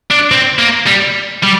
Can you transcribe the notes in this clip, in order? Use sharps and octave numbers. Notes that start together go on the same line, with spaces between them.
D4
C4
A#3
G3
G3